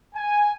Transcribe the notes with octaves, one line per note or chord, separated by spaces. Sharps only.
G#5